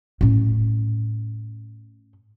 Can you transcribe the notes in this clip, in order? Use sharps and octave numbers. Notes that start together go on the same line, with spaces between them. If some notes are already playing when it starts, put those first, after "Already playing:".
A2 C#4